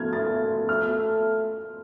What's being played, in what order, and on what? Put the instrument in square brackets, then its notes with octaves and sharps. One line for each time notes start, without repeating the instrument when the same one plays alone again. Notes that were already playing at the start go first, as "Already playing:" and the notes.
Already playing: [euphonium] A3 [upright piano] F6 G#6
[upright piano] A6
F6